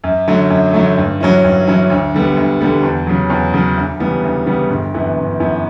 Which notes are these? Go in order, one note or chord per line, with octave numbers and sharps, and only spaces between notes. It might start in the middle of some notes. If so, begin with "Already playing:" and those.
F#2
D3 F#3 A3
F#2
D3 F#3 A3
G2
F#3 C#4 E4
G2
F#3 C#4 E4
D2
D3 G3 B3
D2
D3 G3 B3
E2
C#3 F#3
E2
C#3 F#3
D2
C#3 E3 G3 B3
D2
C#3 E3 G3 B3
G1
F#2 E3 B3 E4
G1
F#2 E3 B3 E4